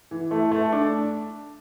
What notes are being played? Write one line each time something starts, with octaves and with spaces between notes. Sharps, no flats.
E3
A3
A3
D4